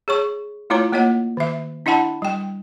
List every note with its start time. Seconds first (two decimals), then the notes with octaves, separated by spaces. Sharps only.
0.08 G#4 C#5 C#6
0.70 A3 E4 F4 C#5 A#5
0.92 A#3 F4 C#5 D#5 F#5
1.37 D#3 E5
1.86 D4 E4 D#5 F#5 A5 B5
2.22 G3 G5